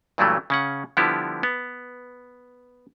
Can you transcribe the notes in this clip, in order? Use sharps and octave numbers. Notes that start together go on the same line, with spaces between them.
G2 A#2 E3 F#3 G3 A3
C#3 C#4 F#5
D3 F3 G3 B3 E4 G4
B3